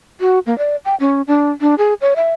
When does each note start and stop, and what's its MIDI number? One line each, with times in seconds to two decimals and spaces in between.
0.21 0.39 66
0.46 0.57 58
0.58 0.76 74
0.85 0.95 79
1.00 1.22 61
1.27 1.50 62
1.61 1.75 62
1.78 1.94 68
2.01 2.14 73
2.16 2.34 76